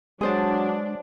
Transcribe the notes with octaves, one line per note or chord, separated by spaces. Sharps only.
F#3 G#3 D4 G#4 C5 A5